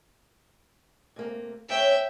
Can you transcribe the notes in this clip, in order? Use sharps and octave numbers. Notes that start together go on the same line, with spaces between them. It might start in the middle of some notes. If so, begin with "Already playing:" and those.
C3 A3 A#3
C#3 B3 C#5 E5 G5